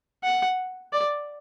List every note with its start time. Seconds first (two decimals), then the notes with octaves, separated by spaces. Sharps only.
0.24 F#5
0.93 D5